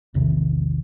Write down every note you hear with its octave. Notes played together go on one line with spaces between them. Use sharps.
A#1 E2 C3 D#3